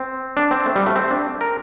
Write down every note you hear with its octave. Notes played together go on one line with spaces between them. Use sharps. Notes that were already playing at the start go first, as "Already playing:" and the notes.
Already playing: C4
D4
C4
A3
G3
A3
C4
D4
A#4